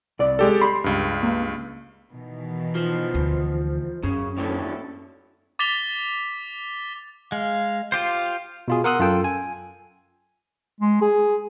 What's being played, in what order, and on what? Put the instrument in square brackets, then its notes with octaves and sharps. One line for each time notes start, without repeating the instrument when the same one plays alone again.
[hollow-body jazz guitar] C2 D5
[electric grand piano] G#3 G4 A4
[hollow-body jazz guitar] G4 B5 [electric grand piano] C6
[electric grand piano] C#2 G2
[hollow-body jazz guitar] A#3
[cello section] B2 D#3 E3
[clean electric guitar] F3
[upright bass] D2
[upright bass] F#2 [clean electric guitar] C#3
[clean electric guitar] D#2 A2 D3 [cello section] C#4 E4 A4
[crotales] D6 A6 B6 F7 G7
[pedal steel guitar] G#3 [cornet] F5
[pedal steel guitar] F4 G4 C5 [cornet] F5
[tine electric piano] B2 F4 G#4
A#4 F#5 C6 D#6 E6 F#6
F#2 F4 A4 G5 E6
G#5
[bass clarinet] G#3
G#4